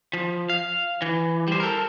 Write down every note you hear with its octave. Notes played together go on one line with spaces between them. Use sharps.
F3
F5
E3
G3 C5
A4 A#4